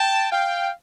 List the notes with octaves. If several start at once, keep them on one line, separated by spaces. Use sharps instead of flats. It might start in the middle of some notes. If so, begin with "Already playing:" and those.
Already playing: G5 A5
F5 G5